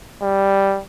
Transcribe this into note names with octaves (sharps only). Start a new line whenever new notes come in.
G3